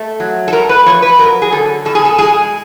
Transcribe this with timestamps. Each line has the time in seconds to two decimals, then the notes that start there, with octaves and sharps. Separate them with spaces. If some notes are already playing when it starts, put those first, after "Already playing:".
Already playing: A3
0.20 F#3
0.48 A4
0.53 A3 A#4
0.69 B4
0.86 F3 C#5
1.02 B4
1.19 F#3 A#4
1.42 G#4
1.52 D3 A4
1.85 B2 A4
1.95 G#4
2.05 A4
2.18 G#3 G#4